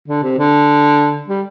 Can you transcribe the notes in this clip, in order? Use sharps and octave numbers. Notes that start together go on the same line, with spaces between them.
D3
C3
D3
G3